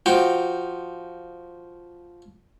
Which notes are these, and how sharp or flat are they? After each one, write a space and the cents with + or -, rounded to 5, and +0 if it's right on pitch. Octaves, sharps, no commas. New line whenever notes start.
F3 +0 F#4 +0 G5 -5